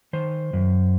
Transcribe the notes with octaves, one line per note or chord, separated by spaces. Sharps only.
D#3 C5
F#2